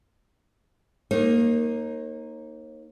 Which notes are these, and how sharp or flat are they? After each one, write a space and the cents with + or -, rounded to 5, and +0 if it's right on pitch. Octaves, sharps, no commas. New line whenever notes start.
A#3 +0 D#4 +0 C#5 -40